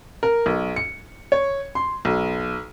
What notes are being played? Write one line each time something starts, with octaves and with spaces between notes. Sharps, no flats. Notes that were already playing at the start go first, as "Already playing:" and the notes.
A#4
B1
C#7
C#5
C6
B1